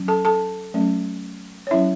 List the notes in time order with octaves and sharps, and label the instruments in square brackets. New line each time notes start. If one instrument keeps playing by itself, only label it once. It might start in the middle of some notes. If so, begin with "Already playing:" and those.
Already playing: [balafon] F#3 C#4
A4 A5
A4 A5
F#3 A3 C#4
C#5
F#3 C#4 E4 E5